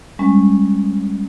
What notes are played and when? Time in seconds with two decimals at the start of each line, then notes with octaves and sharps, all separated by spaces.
0.19 G3 G#3 C#4